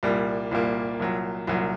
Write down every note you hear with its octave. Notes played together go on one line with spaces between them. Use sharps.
C2 A#2 G3 A#3
C2 A#2 G3 A#3
C2 A#2 F#3
C2 A#2 F#3